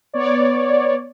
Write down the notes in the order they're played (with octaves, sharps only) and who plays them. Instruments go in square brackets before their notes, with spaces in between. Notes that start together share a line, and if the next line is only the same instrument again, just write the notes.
[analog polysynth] B3 C#5 D5